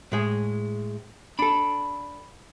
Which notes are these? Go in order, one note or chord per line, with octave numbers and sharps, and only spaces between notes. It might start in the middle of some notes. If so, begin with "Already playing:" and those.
A2 G#3 G#4
D4 A4 B5